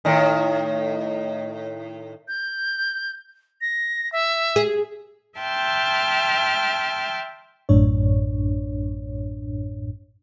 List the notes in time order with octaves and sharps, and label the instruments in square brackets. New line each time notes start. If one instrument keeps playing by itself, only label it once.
[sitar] A2 D#3
[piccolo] G6
A#6
E5
[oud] G#4
[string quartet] E5 G5 A5 C6 F6
[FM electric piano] A1 F#2 A2 D4 C#5